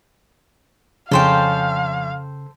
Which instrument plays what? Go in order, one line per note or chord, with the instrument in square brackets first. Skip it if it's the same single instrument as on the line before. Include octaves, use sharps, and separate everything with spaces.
[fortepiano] F2 C#4 [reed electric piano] C#3 [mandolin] A4 C5 G5 [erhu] F5